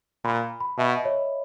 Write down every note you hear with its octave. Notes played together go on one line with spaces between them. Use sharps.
A#2 B5
B5
B2 E5
D#5
C#5